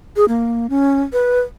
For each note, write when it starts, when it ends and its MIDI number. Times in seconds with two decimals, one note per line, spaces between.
0.16 0.25 68
0.28 0.67 58
0.70 1.01 61
1.13 1.41 71